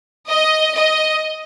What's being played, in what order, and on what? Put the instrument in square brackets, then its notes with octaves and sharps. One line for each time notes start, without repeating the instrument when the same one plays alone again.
[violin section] D#5
D#5